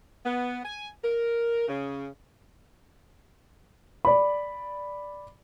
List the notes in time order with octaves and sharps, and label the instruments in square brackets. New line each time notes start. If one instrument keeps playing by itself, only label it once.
[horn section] B3
G#5
A#4
C#3
[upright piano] D5 B5